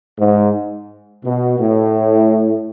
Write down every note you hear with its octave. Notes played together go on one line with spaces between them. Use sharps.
G#2
B2
A2